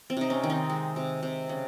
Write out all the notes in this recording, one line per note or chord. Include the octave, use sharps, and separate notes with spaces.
C4
C3 D#4
C#4
D#3
C4 D#4
G#3
C3
C3
C#3